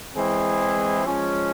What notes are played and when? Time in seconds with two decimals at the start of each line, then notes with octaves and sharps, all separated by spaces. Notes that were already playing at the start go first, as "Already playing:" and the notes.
0.15 E3 G#3 C4 E4 G#4
1.05 F3 G#3 C#4